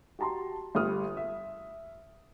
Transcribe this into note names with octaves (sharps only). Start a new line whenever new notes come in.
F#4 G4 A5 A#5 C6
G1 G3 A3 G4 D#6 F6
E5